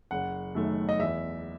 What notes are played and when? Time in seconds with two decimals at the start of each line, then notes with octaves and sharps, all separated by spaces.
0.11 F#1 F#5
0.55 F#2 D#3 A3
0.89 D#5
0.99 E2 E5